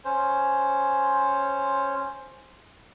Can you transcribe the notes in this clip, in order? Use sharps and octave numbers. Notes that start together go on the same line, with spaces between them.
C#4 C5